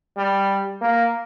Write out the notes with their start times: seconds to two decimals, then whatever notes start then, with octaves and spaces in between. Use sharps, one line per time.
0.17 G3
0.82 A#3